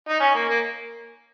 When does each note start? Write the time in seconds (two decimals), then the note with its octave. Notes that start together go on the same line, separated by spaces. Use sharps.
0.09 D#4
0.20 C#4
0.35 A#3
0.49 A#3